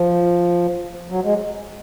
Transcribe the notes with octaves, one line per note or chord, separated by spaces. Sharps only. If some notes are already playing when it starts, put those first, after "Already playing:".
Already playing: F3
F#3
G#3